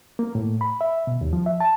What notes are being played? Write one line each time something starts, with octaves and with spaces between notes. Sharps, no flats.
A#3
A2
B5
E5
B2
D#2
F3
E5
A5